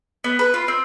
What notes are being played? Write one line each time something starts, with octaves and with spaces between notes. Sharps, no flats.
B3
B4
F4
C4